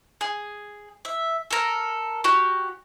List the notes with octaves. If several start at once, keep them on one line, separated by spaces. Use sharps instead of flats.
G#4
E5
A4 A#4
F#4 G4